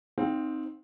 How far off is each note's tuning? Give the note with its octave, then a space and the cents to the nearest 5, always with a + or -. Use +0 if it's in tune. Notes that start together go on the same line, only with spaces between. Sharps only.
C4 +0 D#4 +0 F5 +35